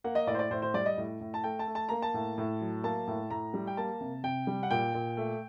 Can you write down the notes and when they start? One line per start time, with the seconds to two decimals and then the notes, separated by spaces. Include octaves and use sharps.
0.04 A#3 F#5
0.15 D#5
0.27 A2 D5
0.34 C5
0.39 D5
0.51 A2 C5
0.62 C5
0.74 G3 D5
0.86 D#5
0.97 A2
1.21 A2
1.34 A5
1.44 A3 G5
1.59 A5
1.67 A3
1.75 A5
1.89 A#3 A#5
2.02 A5
2.14 A2
2.38 A2
2.61 F#3
2.84 A#3 A5
3.08 A2
3.30 A2 A#5
3.54 G3
3.67 G5
3.77 A#3 A5
4.01 C3
4.24 C3 G5
4.47 G3
4.63 F#5
4.71 A#2 G5
4.94 A#2
5.17 A3